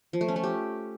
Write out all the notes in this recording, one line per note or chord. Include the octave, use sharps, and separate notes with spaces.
F3
A3
C#4
A3
G4